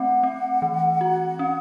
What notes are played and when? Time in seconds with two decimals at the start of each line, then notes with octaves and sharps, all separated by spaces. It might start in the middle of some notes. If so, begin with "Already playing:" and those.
Already playing: A3 C4 F#5
0.23 C4
0.62 E3
1.01 F#4
1.39 C#4